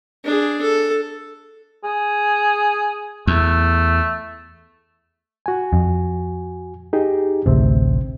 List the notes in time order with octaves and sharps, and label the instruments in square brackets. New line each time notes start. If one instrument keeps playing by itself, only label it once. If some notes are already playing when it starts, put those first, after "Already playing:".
[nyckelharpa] D4 G#4
A4
[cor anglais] G#4
[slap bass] E2 [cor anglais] A3
[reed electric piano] F#4 G#5
[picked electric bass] F2
[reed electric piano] D#4 G4 G#4
[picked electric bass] A1 D2 [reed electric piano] C3 C4